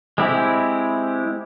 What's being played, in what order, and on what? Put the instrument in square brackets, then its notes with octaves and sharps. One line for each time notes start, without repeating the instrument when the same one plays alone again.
[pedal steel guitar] G#3 C4 E4 G4